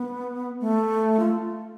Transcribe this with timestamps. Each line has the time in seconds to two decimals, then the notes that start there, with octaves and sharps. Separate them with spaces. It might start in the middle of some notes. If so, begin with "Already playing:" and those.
Already playing: B3
0.61 A3
1.19 F4